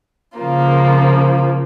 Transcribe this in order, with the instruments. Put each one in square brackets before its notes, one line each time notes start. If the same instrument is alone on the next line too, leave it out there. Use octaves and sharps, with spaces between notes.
[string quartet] C#3 F3 A#3 F4